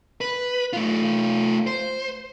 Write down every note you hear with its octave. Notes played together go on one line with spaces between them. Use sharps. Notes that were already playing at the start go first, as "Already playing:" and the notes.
B4
A3 F4
C5